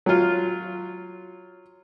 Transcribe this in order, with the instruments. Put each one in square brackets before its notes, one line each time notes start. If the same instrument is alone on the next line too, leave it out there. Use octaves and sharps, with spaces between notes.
[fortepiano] F#3 F4